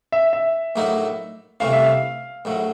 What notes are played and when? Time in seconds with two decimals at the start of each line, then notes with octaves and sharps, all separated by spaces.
0.12 E5
0.33 E5
0.76 A#1 A2 F#3 A#3 D#4
1.60 C2 C3 E3 A3 C#4 F5
1.73 E5
1.83 F5
2.45 A#1 A2 F#3